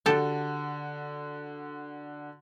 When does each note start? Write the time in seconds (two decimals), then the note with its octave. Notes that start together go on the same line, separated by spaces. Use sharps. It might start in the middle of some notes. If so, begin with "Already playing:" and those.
0.06 D3 F#4 G4 A4 A5